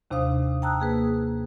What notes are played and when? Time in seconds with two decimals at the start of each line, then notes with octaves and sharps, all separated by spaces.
0.11 D#2 C3 D4 C5 F5 D#6
0.62 G5 A5 A#5 D#6 E6 F#6
0.80 A#3 G#4 B4